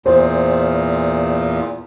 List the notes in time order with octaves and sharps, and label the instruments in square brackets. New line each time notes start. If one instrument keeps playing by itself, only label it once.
[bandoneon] E2 A#2 [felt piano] C5